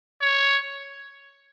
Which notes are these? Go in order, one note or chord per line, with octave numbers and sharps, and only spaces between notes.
C#5